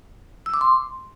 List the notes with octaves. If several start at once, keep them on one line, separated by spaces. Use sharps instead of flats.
E6
D6
C6